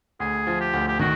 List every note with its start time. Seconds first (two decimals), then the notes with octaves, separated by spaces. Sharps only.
0.20 D2 G#4
0.47 F3
0.60 G4
0.73 D2
0.88 G4
0.99 D#3 F#4